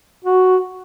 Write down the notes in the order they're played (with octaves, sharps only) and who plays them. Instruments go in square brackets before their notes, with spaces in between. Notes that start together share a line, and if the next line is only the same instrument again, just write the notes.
[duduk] F#4